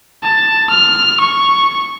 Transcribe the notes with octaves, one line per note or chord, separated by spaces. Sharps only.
A5
F6
C#6